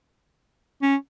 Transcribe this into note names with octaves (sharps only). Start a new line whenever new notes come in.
C#4